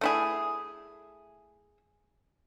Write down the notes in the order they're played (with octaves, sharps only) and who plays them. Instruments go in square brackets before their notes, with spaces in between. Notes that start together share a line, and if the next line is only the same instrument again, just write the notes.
[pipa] A3 E4 G#4